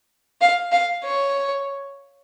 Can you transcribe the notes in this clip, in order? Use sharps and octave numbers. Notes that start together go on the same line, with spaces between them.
F5
F5
C#5